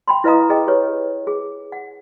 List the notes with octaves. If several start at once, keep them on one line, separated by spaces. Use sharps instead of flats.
G5 B5 C6
E4 B4 D#5 F5 A#5 D#6
G#4 D#5 G5
G4 B4 C#5
G#4
F#5